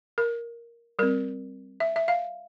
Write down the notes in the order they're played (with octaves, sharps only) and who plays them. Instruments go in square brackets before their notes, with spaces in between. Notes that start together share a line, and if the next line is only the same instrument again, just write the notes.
[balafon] A#4
G3 C4 A#4
E5
E5
F5